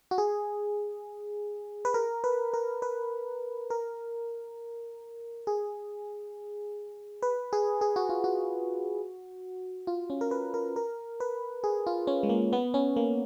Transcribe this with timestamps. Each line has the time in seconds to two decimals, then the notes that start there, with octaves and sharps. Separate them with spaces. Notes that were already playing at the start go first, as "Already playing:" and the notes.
0.11 F#4
0.18 G#4
1.85 B4
1.94 A#4
2.24 B4
2.54 A#4
2.82 B4
3.70 A#4
5.47 G#4
7.22 B4
7.53 G#4
7.81 G#4
7.96 F#4
8.09 F4
8.24 F#4
9.87 F4
10.10 C#4
10.21 A#4
10.31 B4
10.54 A#4
10.76 A#4
11.20 B4
11.64 G#4
11.87 F4
12.07 C#4
12.23 G#3
12.29 A#3
12.53 B3
12.74 C#4
12.96 A#3